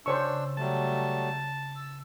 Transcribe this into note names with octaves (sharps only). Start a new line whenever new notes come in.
C#3 D4 C5 C#5 C#6 E6
F#3 G3 A3 A5
E6